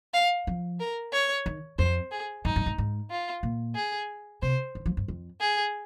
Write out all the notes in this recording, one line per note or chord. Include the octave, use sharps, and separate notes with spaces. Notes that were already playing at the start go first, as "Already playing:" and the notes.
F5
F3
A#4
C#5
D#3
F2 C5
G#4
G2 D#4
G2
G#2
G#2
F4
A#2
G#4
C3 C5
D#3
F3
G2
F2
G#4